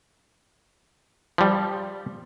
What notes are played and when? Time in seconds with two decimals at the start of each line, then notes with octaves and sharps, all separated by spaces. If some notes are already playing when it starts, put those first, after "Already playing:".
1.38 F3 G3